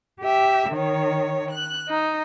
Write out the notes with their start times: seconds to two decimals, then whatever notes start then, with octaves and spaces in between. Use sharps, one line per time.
0.21 G4 E5
0.73 D#3 C#5
1.50 F#6
1.88 D#4